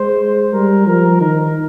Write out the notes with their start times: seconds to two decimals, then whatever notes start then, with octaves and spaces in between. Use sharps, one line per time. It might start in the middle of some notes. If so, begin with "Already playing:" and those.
Already playing: G#3 C5
0.53 G3 A#4
0.86 F3 A#4
1.20 D#3 A#4